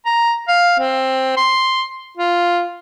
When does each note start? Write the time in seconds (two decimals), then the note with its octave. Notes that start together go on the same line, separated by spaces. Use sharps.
0.06 A#5
0.48 F5
0.79 C4
1.37 C6
2.17 F4